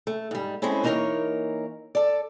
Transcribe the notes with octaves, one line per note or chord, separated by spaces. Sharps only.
A3
G#2 G3
G#3 A3 C4 C#4 E4
E3 A#3 D#4 G#4 A#4 C#5
A4 D5